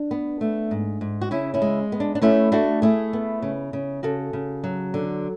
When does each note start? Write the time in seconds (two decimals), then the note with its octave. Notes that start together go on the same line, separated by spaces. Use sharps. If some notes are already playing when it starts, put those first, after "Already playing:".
Already playing: D4
0.11 B3
0.41 A3
0.71 G#2
1.01 G#2
1.21 F#4
1.31 C#3 C#4 E4
1.54 C#4 E4
1.62 G#3
1.92 B3
2.00 D4
2.15 D4
2.22 A3 C#4 E4
2.52 A3 D4 F#4
2.82 A3 E4 G#4
3.13 B3
3.42 C#3
3.73 C#3
4.03 C#3 F#4 A4
4.33 C#3
4.64 F#3
4.94 D3